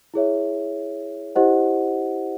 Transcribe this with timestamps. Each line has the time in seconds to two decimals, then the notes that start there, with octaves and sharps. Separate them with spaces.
0.14 E4 G#4 C#5 E5
1.35 E4 G4 C5 D#5 F#5